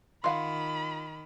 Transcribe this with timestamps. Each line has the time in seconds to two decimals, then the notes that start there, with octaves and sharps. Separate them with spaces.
0.24 D#3 F4 F5 F#5 B5 C6